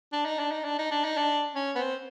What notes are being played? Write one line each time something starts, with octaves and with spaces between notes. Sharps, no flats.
D4
D#4
D4
D#4
D4
D#4
D4
D#4
D4
C#4
B3
C4